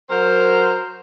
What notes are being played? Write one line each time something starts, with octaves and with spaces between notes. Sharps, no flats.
F#3 A#4 C5